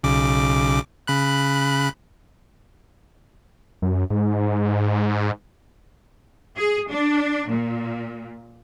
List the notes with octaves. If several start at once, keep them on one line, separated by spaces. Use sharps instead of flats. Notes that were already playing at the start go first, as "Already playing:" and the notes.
B1 C#3 D6
C#3 B5 F#6
F#2
G#2
G#4
D4
A#2